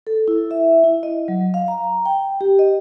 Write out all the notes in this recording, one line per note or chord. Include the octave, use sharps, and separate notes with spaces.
A4
E4
E5
E4
D#5
F#3
F5
A#5
A#5
G5
G4
D#5